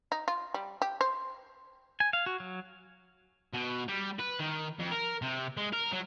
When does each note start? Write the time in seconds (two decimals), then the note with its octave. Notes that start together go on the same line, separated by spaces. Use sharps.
0.12 D#4
0.28 F4
0.54 G3
0.82 G4
1.01 C5
2.00 G#5
2.13 F5
2.26 F#4
2.40 F#3
3.54 B2
3.88 G3
4.19 B4
4.39 D#3
4.79 F2
4.91 A#4
5.22 C3
5.57 G#3
5.73 A#4
5.92 F#3